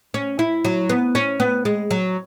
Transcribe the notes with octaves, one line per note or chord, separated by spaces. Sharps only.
C#4
E4
F#3
B3
C#4
B3
G#3
F#3